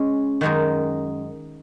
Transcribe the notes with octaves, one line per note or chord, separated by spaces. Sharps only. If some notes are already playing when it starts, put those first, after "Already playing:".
Already playing: G#3 C#4
F#2 D#3 G#3 D#4 F#4